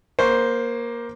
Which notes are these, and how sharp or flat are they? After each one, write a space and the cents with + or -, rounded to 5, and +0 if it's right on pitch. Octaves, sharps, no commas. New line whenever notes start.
A#3 +15 C5 +0 C#6 +0